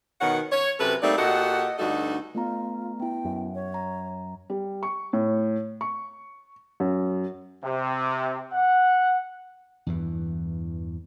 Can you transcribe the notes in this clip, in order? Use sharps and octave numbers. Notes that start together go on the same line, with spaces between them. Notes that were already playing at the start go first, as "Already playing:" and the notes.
B2 D#3 A#4 C#5 F#5
C#5
F#2 C3 A4 B4
G3 A3 A#3 C4 D#4 D5
A#2 F#4 G4 A4 D#5 F#5
D2 G2 D#4 F#4 A4 D#5
A3 B3 F4 A#5
B3 E4 G5
F#2
C#5
A#5
G3
C#6
A2
C#6
F#2
C3
F#5
E2 G2 E3